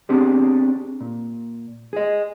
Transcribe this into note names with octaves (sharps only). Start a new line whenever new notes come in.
B3 C4 D4 G4 G#4
A#2
G#4 D#5